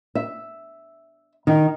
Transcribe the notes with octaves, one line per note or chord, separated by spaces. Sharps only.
E5
D#3